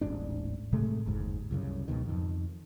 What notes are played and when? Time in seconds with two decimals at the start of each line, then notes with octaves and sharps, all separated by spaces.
0.01 D#1 A1 G#2 D4
0.73 A2 C3 G#3 A3
1.06 F#1 D#2 G#2
1.51 C2 F#2 C#3
1.88 C#2 G#2 B2 D#3
2.06 F2 D#3